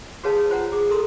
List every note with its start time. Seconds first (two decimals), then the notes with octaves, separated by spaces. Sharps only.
0.24 F#4 G#4 B4 C#5 F5 A5
0.50 F4 C5 F#5 A#5
0.72 G#4 D6
0.90 A4 A#4 A#5 C6 D#6